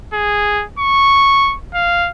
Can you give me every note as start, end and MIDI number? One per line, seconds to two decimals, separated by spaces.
0.13 0.64 68
0.79 1.56 85
1.74 2.10 77